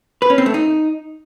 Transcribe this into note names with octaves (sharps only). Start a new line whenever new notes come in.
B4
C#4
C4
A3
D#4